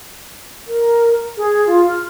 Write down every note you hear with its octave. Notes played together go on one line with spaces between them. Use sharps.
A#4
G#4
F4
F6